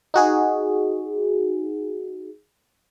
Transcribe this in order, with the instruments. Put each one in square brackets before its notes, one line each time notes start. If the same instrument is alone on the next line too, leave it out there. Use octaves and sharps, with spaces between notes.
[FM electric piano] D#4 F#4 G#4